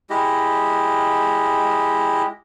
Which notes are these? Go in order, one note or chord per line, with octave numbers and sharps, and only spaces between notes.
G#3 E4 G4 D#5